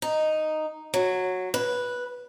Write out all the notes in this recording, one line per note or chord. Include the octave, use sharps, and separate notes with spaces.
D#4
F#3
B4